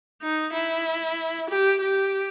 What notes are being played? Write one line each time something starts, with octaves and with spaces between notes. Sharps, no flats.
D#4
E4
G4
G4